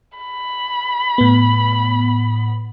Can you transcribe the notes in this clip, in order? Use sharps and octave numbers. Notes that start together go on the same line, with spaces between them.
B5
A2 B3